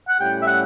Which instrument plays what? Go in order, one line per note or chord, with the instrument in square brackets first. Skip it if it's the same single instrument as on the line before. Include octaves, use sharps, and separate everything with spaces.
[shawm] F#5
[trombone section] A2 G3 C#4 E4 G4 [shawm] G5
[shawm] E5
F#5